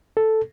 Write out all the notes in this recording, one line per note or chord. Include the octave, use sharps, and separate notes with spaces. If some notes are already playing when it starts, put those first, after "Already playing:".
A4